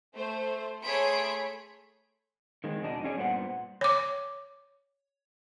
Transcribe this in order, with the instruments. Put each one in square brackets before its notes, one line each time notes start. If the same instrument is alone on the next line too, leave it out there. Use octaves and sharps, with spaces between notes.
[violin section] A3 C5
A3 G#4 C#5 B5 C6 D7
[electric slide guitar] D#3 G#3 A#3 C4
E2 B2 D4 D#4
C#4 G#4 D5
G2 A#2 B3 F#4 C5 F#5
[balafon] C#5 D6